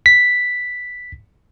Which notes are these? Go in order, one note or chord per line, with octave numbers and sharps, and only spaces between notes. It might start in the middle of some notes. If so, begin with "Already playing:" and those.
B6